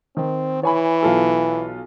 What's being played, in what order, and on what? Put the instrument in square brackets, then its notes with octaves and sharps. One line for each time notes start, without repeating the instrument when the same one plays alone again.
[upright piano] D#3 [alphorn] C4
[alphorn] E3 [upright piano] C#5 G#5 B5
[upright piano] B1 F4 A4